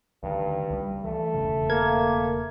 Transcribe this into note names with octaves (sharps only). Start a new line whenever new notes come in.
D2 G2 D#3
C#2 G3
E3 A3
E1 F2 C#3
A#3 A#4 G#6